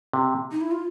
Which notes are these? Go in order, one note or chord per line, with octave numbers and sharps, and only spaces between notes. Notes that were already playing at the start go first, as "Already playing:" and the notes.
C3
D#4
E4
F4